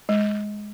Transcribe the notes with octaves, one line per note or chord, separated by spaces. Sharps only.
G#3